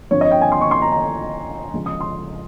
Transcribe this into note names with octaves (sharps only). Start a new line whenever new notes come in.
G2 F3 C4 C#5
D#5
G5
G#5
C6
C#6
C6
A#5
A#5
C#2 C#3 F3 G#3
D#6
C6